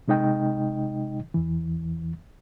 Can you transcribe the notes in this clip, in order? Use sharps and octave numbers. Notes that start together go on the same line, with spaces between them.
C3 G#3 D#4 D#5 G5
E2 E3